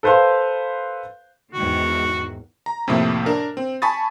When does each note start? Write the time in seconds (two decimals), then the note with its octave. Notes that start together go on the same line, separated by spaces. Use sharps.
0.03 A4 B4 C5 F5 C6
1.54 E2 G#2 D#3 F#4
2.66 A#5
2.88 F2 A2 C3 F3 A#3 E4
3.26 D4 A#4
3.57 C4
3.82 G#5 A5 B5 C#6 D#6 A6